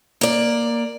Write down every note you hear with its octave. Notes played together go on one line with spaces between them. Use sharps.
A#3 D5